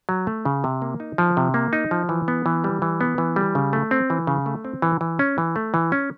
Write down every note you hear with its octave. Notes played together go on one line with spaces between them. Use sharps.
F#3
A3
C#3
C3
A#3
D#4
F3
C3
A#3
D#4
F3
E3
B3
E3
G3
E3
B3
E3
G3
C#3
A3
C4
E3
C#3
A3
C4
E3
E3
C#4
E3
A3
E3
C#4